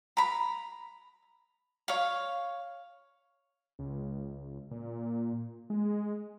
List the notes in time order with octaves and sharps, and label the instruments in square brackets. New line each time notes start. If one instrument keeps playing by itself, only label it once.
[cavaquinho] A#5 B5
C#5 F5
[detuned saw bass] C#2
A#2
G#3